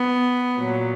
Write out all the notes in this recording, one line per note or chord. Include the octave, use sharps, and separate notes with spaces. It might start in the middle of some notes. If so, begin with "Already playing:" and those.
Already playing: B3
A#2 F#3